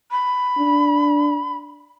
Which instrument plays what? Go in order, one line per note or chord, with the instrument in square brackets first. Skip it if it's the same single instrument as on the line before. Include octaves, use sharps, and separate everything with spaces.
[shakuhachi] B5
[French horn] D4